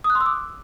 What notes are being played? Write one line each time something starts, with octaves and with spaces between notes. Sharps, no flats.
D#6
F#6
C6
E6
D6